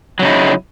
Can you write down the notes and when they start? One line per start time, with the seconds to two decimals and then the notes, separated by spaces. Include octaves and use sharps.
0.19 F#3
0.22 C#3
0.25 D#4
0.27 E4